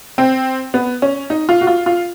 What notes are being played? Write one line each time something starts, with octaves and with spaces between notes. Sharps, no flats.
C4
B3
C#4
D#4
F4
F#4
F4
F4